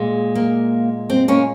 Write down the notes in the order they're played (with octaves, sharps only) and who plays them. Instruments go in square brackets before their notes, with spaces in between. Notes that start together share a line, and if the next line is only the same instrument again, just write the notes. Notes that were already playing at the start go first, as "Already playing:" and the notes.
Already playing: [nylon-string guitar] A#2 G#3
A#3
C4
A#3 C#4